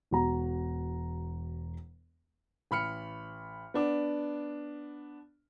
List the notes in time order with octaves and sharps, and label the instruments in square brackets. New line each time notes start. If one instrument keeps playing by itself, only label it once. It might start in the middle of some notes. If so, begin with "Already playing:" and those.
[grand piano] E1 F#4 A#5
[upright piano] A1 B5 F6 C#7
B3 D4 D6